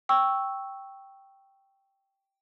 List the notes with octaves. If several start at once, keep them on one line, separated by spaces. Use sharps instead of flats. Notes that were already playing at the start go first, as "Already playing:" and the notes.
G5 C#6 E6